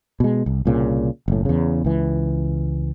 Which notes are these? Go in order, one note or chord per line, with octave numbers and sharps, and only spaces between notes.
B2 G#3
C2
C2 A#2 C#3
F#1 A2
E2 C#3
C#2 E3